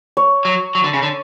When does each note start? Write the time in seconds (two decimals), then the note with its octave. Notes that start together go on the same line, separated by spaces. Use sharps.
0.17 C#5
0.45 F#3
0.75 F#3
0.84 D3
0.94 C#3
1.03 D3